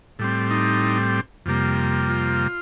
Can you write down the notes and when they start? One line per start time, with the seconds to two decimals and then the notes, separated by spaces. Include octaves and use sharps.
0.19 A2 G3 C4
0.51 D#4
1.46 F2 C3 G3 A#3
2.09 F4